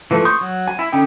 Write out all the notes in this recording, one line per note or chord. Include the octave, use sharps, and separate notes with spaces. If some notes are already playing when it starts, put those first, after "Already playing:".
E3 F3 A3
C6 C#6 D#6 G6
F#3
G#5
E4
D3 C#4 D#4 G5